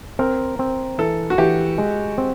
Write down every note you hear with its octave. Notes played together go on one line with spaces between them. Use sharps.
C4 A#4
C4
E3 A4
F#4
E3 G4
G#3
C4